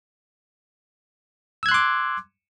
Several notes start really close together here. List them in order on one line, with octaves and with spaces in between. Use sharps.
E6 G#6 F#6 C6 D6